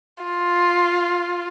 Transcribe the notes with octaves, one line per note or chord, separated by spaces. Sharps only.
F4